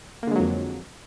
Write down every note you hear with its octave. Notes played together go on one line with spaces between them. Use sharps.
F2 D3 F#3 G#3 A#3